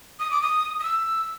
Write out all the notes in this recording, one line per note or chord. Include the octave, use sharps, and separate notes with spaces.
D#6
D6
D#6
D#6
E6